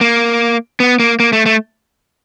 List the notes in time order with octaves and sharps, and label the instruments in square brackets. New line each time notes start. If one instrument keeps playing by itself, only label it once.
[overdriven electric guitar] A#3
B3
A#3
A#3
A3
A3